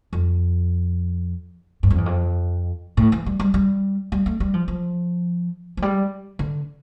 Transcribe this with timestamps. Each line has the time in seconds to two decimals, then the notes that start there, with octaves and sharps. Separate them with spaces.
0.13 F2
1.83 G2
1.90 F2
1.98 E2
2.06 F2
2.97 A2
3.12 E3
3.26 G3
3.40 G3
3.54 G3
4.12 G3
4.26 A3
4.40 G3
4.54 F3
4.68 F3
5.77 F3
5.82 G3
6.39 D3